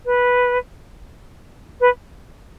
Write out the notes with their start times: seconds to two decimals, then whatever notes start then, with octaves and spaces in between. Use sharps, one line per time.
0.05 B4
1.80 B4